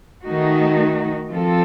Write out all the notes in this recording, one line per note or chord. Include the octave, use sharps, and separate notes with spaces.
D#3 A3 D#4 F#4
F3 C4 F4 A4